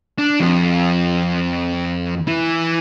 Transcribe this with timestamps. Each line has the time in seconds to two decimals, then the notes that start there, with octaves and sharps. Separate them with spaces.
0.18 D4
0.40 F2
2.27 E3